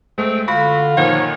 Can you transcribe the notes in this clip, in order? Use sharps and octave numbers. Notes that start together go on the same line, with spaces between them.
G#3 A3 C4
D3 F4 F#4 B5
A#2 D#3 F3 C#5 F#5